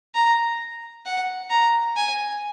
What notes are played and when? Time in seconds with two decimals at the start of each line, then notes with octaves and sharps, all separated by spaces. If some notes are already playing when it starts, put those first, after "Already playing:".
0.15 A#5
1.06 F#5
1.50 A#5
1.96 G#5